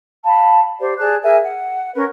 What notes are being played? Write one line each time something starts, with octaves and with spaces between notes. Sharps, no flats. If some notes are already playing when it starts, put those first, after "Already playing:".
F5 A5 B5
G4 C5 D5
G#4 D5 A5 F#6
G#4 A#4 E5 G#5
F#5
C#4 A#4 B4